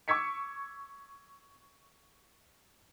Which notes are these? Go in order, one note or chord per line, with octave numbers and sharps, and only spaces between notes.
C#6 D6 E6 G#6 B6 C#7